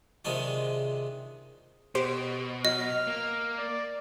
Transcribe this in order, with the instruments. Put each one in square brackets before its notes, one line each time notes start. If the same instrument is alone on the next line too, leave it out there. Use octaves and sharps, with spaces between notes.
[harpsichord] C3 D#3 G#3 D4 D#4 F4
[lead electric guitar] B2 [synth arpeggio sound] G4 C5
[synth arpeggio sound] F#3 [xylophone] D#5 [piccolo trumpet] F6
[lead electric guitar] A#3
[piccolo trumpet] D5